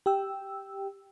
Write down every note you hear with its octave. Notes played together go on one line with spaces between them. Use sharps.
G4 G5 E6